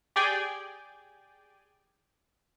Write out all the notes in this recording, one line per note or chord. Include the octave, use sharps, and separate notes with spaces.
G4 G#4 D5 G5 G#5